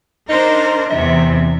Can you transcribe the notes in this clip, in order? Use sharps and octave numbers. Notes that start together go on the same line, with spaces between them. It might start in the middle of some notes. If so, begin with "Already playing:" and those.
D4 D#4 A#4 C5
E2 C3 E3 E5